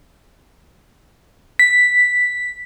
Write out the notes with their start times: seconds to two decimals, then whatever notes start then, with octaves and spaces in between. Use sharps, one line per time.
1.59 B6